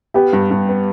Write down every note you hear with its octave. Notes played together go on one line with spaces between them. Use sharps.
B3 G4
G2
G2
B3